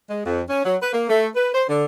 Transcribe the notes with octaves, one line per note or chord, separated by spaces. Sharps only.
G#3
F2
C#4
F#3
B4
A#3
A3
B4
C5
D3